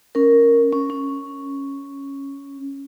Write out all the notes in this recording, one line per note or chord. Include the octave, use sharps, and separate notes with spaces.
C#4 A#4
C#4
C#4